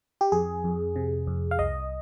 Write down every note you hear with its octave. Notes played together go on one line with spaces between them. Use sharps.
G4
F2 G#4
F2
C3
F2
F5
C2 D#5